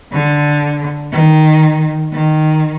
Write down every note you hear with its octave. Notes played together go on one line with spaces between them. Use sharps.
D3
D#3
D#3